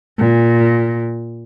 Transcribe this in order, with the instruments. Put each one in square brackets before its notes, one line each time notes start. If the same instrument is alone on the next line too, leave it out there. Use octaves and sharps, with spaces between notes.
[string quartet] A#2